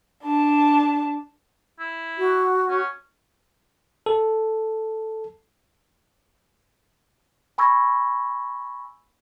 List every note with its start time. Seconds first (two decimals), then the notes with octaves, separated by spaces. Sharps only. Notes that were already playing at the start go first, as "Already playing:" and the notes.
0.24 D4 A5
1.80 E4
2.18 F#4
2.69 C#4
4.06 A4
7.58 G#5 B5 C#6 E6 G#6 A#6